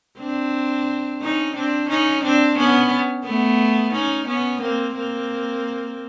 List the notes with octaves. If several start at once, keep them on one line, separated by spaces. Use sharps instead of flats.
C4 D4
C#4 D#4
C4 D4
C#4 D#4
C4 D4
B3 C#4
A3 B3
C#4 D#4
B3 C#4
A#3 C4
A#3 C4